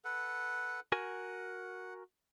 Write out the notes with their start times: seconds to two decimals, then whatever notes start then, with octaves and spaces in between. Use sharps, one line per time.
0.04 A4 B4 F#5
0.92 F#4 A#4 F#5 G#5